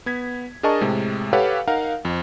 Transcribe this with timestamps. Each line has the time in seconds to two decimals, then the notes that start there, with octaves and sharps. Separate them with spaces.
0.06 B3 G#6 B6
0.63 D4 G#4 A#4 D#5 A5 C#6
0.81 A2 C3 G#3
1.33 G4 A4 B4 C#5 F5 F#5
1.67 D#4 A#4 F5 F#5
2.05 F2